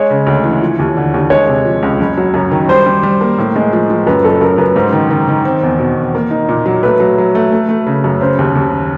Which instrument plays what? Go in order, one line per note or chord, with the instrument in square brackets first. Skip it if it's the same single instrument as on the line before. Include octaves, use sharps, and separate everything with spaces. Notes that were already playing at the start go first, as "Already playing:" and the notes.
Already playing: [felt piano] G#3 [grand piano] C#5
[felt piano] C#3
D2
E3
F3
D#2
D3
D#2
[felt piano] G#3 [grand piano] C#5
[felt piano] C3
F3
C#2
F#1
F#3
F#2
D#3
[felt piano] G3 [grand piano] C5
[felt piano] G3
G3
A#3
A2
G#3
F3
F3
[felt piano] F#2 [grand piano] B4
[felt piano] F#1 [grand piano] A4
[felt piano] F#2 [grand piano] A#4
[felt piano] F#2 [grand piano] B4
[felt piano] G#2 [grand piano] C5
[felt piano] D#3
D#3
D#3
C4
E2
B2
E2
A#3
D#4
A#2
F#3
[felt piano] A3 [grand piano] B4
[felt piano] F#3
F#3
A3
A3
A3
C#3
F#2
[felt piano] C#3 [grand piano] C5
[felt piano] D#2
D#2